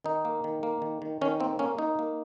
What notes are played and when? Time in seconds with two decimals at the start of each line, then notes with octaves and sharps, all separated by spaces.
0.04 D#3 D#4
0.25 A#3
0.44 D#3
0.63 A#3
0.82 D#3
1.02 D#3
1.21 D#3 C#4
1.40 A#3 C4
1.59 A#3 C#4
1.79 A#3 D#4
1.99 A#3